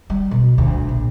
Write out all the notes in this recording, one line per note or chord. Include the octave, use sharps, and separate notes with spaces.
G3
B2
D2
A#1